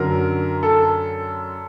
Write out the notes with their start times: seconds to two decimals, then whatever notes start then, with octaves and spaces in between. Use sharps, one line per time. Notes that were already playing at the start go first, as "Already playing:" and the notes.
Already playing: F#2 D3 F#3 A#4
0.63 A4